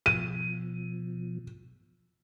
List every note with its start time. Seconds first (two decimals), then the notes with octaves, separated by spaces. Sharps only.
0.06 B2 F3 D#7